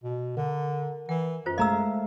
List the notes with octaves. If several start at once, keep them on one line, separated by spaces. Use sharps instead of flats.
B2
D3 A#4
E3 F#5
F#2 F4 C5
G#3 A3 D#5 F5 A#5 E6